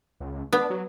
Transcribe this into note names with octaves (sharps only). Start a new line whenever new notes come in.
C#2
B3 D4
F#3